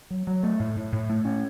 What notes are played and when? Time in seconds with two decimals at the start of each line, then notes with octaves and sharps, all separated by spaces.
0.10 F#3
0.27 F#3
0.43 A3
0.59 A2
0.76 A2
0.92 A2
1.09 A3
1.25 C#4